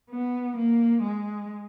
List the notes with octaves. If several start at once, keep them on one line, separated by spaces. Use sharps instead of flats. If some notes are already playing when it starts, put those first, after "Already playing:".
B3
A#3
G#3